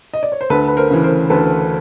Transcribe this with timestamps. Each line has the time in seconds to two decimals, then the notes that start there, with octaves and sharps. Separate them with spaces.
0.14 D#5
0.23 D5
0.32 C#5
0.41 C5
0.50 D2 A4 B4
0.68 B4
0.77 A#4 C5
0.90 C#3 E3
1.03 A#4 C5
1.30 D2 A4 B4